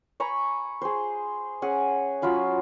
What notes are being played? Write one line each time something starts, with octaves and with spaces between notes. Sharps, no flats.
G#5 A#5 B5 C#6
G#4 C5
C#4 G#4 F#5
F#3 C#4 F4 B5